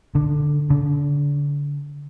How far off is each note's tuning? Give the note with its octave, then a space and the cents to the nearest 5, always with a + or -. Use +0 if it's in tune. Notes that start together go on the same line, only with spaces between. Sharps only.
D3 +5
D3 -30